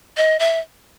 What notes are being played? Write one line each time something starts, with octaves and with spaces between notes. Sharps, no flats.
D#5
E5